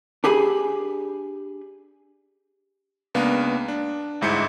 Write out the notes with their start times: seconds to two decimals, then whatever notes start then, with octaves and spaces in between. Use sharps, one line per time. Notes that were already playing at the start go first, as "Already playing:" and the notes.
0.24 D4 G4 G#4 G#5 B5
3.14 C#2 A#3 B3 D4 A#4 F5
3.68 D4
4.21 G1 D2 G#2 E4 G6 C#7